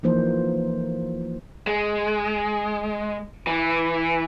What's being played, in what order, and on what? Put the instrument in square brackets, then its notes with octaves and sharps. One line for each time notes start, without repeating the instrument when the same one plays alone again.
[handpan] E3 F3 A#3 D#4 F4 C5
[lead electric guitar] G#3
E3